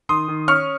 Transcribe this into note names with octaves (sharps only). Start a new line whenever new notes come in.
D#3 C6 D#6
D#3
C#4 C#6 F6